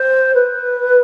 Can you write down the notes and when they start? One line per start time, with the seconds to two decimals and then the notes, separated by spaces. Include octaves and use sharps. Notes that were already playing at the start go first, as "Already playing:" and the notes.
Already playing: C5
0.34 B4